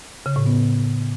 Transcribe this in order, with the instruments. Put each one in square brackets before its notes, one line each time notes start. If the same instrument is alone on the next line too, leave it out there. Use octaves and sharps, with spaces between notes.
[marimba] C#3
A2
B3